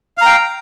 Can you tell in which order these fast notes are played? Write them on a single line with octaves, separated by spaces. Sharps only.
F5 A#5 G5